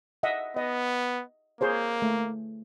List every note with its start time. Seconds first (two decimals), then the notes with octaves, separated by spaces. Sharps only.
0.23 D#5 E5 F#5
0.57 B3 D#5
1.61 A#3 G#4 C5 C#5
2.02 A3